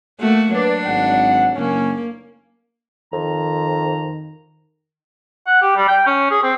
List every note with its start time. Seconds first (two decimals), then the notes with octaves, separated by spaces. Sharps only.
0.20 A3 A#3 F#4
0.54 F#3 D4 B4 D5
0.85 G#1 F#5
1.56 F#1 A#3 C#4
3.13 F2 D#3 A#5
5.47 F#5
5.62 G4
5.76 G3
5.88 G5
6.06 C#4
6.31 G#4
6.43 C4